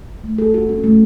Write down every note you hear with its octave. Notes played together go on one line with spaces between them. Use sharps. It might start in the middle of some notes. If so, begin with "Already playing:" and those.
A3
A4
F#4
C#4
A3